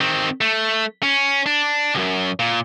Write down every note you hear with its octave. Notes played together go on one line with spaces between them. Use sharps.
D#3 C4
A3
C#4
D4
C2 F#2
A#2